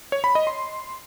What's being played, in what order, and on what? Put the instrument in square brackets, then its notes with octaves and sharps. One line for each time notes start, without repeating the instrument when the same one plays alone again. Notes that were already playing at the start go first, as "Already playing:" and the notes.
[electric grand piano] C#5
B5
D#5
C6